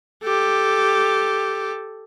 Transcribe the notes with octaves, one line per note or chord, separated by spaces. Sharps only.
G4 A4